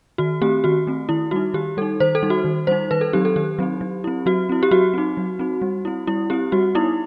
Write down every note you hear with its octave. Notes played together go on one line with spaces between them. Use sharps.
D#3 F#4
A3 C4 G4
D#3 F#4
A3 C4
D#3 E4
G3 D#4 F#4
D#3 G4
G3 D#4 A4
D#3 C5
A4
G3 D#4
F#4
D#3
G3 D#4 C5
D#3 B4
A4
F#3 C4 D#4 G4
A4
D#3 G4
F#3 C4 D#4
F#3
C4 E4
F#3 F#4
C4 E4
G4
F#3 F#4
C4 D#4
F#3
C4 D#4
G3
C4 E4
G3 E4
C4 E4 G4
G3 F#4
B3 D#4 E4